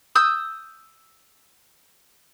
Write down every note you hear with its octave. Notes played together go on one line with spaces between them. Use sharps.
D#6 E6 G6